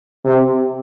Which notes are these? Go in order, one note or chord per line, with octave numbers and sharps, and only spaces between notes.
C3